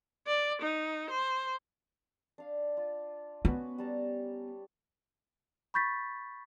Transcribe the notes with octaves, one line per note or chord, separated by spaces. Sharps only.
D5
D#4
C5
D4 F5
F4
B3 C#4 F#4 B4
G3 A5 A#5
B5 C#6 G6 A6 B6